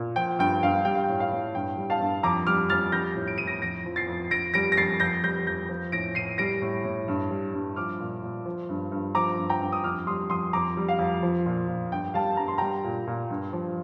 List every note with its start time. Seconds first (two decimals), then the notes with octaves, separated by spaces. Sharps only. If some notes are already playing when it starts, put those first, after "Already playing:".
Already playing: A#2
0.16 F3 G5
0.39 G2 G5
0.63 G2 F5
0.85 G3 G5
0.95 F5
1.04 G5
1.09 A2
1.20 F5
1.32 A2
1.55 G2 G5
1.77 G3
1.90 F5 A5
2.01 G2
2.23 F2 A#5 D6
2.47 G3 D6 F6
2.69 F2 F6 A6
2.92 G3 G6 A#6
3.16 A2
3.28 D7
3.38 A2 D#7
3.47 A#6 D7
3.62 F2 A#6 D7
3.86 F3
3.96 A6 C7
4.08 F2
4.31 F2 A#6 D7
4.54 G3 A#6 D7
4.72 A#6
4.77 F2 A6 C7
5.00 F2 G6 A#6
5.24 G3 G6 A#6
5.46 F2 G6 A#6
5.69 F3
5.92 A2 A#6 D7
6.15 A2 C7 D#7
6.38 G3 A#6 D7
6.62 A2
6.84 A2
7.08 G2
7.31 G3
7.54 G2
7.76 F3 D6 F6
8.00 A#2
8.23 A#2
8.46 F3
8.69 G2
8.92 G2
9.15 F3 A#5 D6
9.38 G2
9.50 G5 A#5
9.61 G2
9.72 D#6
9.84 F2 D6 F6
10.07 G3 C6 D#6
10.30 F2 C6 D#6
10.53 F2 A#5 D6
10.77 G3
10.88 F5
10.99 F2
11.23 F3
11.46 A#2
11.68 A#2
11.92 G2 G5
12.14 G3 F5 A5
12.37 G2 A#5
12.48 C6
12.58 G3 G5 A#5
12.84 A#2
13.07 A#2
13.30 G2
13.53 F3